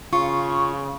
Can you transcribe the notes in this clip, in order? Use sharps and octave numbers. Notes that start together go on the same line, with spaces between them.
C#3 F4 C#6